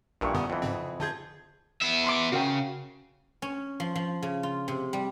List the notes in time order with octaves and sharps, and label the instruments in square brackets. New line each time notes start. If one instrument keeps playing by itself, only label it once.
[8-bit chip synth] A#1 [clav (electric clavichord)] G2 A#2 E3 [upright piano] A#4 G5 C#6
[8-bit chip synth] F#2 D3 B3 [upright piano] F#5 D#6
[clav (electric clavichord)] F2 E3
[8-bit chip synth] G#2 C#3 C4
[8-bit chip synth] D3 F4 G#4 [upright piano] A5 G6 G#6
[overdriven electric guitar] B3 E5
[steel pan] B5 C6 D6
[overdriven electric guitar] C#3 [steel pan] F#4 A#4 G5
[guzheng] C#4
F3
F3
C#3
F4
C3
G3